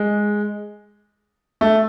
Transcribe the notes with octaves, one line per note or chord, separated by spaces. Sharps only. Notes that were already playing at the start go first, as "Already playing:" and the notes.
Already playing: G#3
A3